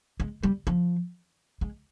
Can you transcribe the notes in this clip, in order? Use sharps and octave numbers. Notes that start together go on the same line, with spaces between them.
G#3
G3
F3
G#3